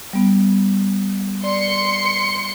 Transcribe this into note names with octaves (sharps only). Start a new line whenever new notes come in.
G3 B3
D5 C6 C#7